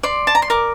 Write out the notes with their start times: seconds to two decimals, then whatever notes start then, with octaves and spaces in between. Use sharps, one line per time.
0.03 D5 C6
0.27 A5
0.35 A#5
0.42 C6
0.50 A#4 D6